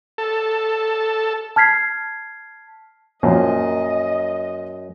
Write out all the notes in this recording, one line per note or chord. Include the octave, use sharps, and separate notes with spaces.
A4
A5 F6 G#6 B6 C7
F#2 A#2 F3 D#5